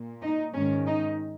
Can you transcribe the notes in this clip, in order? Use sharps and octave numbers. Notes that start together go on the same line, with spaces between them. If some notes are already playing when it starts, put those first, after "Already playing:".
Already playing: A#2
D#4
G#2 D#3 C#4
D#4